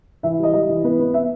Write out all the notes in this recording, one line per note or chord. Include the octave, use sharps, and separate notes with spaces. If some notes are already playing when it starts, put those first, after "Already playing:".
E3 E5
G3 D#5
G3 D#5
E3
B3 B4
B3
B3 E5